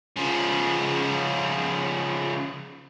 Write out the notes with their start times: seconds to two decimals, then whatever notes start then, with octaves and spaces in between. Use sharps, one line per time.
0.16 C#3 F3